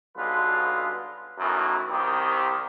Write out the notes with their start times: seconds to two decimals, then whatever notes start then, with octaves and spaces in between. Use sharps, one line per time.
0.15 B1 G2 D3 G#3 F4 B4
1.39 F#2 A2 D#3 E3
1.90 C2 D#3 C4 G4